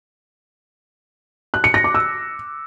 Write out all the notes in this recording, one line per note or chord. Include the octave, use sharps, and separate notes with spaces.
F#6
C#7
A#6
D6
E6